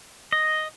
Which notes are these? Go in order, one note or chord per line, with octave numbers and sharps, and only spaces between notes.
D#5